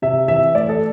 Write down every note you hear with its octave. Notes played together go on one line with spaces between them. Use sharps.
C3 E5
E3 E5
A3 D5
A4